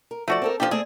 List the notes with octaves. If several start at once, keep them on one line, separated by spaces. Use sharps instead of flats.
A#4
F3 A3 F#4 D5
C4 A4 A#4
F3 D4 D#4 F4 G4
A3 C4 G#4 D5